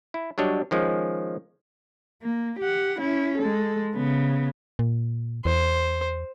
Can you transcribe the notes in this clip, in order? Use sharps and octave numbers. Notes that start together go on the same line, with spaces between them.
E4
F#3 G3 D4 C#5 D#5
D#3 F3 G#3 C#4
A#3
G4 F#5
C#4 E4
G#3 A4
C#3 B3
A#2
E2 C5